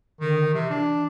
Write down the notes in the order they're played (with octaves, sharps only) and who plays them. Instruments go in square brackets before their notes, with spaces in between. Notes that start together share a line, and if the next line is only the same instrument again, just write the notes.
[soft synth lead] D3 [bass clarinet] D#3
[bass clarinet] C3 [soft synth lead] E3
[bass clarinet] D4